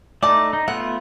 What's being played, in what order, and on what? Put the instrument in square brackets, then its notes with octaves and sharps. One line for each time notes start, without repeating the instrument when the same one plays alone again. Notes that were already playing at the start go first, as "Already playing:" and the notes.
[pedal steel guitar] A3 D#4 [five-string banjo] D5 A5
[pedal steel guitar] D#4
[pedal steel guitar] A3 B3 F4 [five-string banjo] F#5